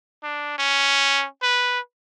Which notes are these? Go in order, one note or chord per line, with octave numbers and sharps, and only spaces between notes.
D4
C#4
B4